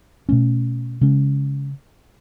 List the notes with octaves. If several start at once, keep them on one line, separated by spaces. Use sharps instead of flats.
B2 A3 C#4
C#3 G#3 C#4